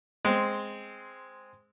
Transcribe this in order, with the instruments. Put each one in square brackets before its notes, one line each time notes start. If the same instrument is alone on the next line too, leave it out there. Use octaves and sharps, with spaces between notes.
[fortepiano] G#3 C4